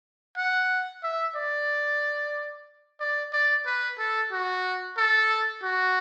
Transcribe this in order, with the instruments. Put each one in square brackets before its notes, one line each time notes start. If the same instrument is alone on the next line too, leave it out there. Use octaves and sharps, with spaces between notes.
[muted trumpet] F#5
E5
D5
D5
D5
B4
A4
F#4
A4
F#4